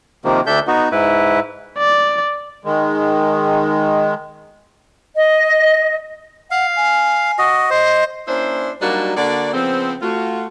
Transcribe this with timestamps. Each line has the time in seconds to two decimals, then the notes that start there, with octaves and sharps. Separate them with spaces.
0.25 C3 D#3 F3 A#3
0.46 D2 D4 A4 E5 G6
0.67 B3 D#4 F#4
0.92 G#2 E4 B4
1.78 D5
2.65 D#3 G#3
5.15 D#5
6.51 F5 F#5
6.76 G#5
7.39 F#4 D#5
7.70 C5 D#5
8.27 A#3 C#4 D4 E4 C5
8.81 F#3 G3 A#3 D4 D#4 F#4
9.16 D3 A#3 F#4 D5
9.53 C#3 F3 B3 C4
10.02 A3 F4 F#4